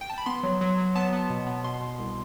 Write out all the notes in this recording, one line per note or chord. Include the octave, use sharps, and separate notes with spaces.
G5
A5
B5
B3 C6
F#3
F#3
F#3
B3 A5
B3
B2
B3
B2 C6
B2
C2